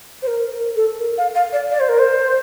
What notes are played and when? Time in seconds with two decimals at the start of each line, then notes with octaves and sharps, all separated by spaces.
0.22 C5
0.27 A#4
0.51 A#4
0.76 A4
0.99 A#4
1.18 F5
1.35 F5
1.53 D5
1.71 D5
1.80 C5
1.89 A#4
1.99 C5